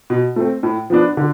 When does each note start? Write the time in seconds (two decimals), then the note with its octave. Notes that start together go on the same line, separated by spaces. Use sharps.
0.10 B2
0.36 A3 C4
0.63 A2
0.90 F3 B3 D4
1.17 D3